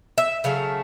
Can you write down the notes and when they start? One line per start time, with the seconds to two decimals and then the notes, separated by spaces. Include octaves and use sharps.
0.18 E5
0.44 C#3 F#3 A3 F5